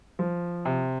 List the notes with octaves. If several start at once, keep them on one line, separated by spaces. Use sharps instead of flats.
F3
C3